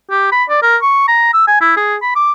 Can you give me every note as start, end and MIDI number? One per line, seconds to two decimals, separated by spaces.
0.10 0.28 67
0.32 0.44 83
0.49 0.60 74
0.62 0.77 70
0.82 1.04 85
1.08 1.33 82
1.34 1.43 88
1.47 1.57 80
1.61 1.74 64
1.77 1.96 68
2.02 2.13 83
2.15 2.32 86